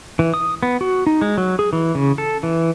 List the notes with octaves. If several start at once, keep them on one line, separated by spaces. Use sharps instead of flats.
E3
D#6
B3
F#4
D#4
G#3
F#3
G#4
E3
C#3
A4
E3